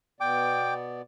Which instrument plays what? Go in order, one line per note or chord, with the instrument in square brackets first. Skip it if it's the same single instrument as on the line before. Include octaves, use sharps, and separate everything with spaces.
[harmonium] B2 B3 D5 [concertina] G5 D6